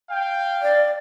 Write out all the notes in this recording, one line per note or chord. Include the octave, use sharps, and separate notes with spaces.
F5 G5
D5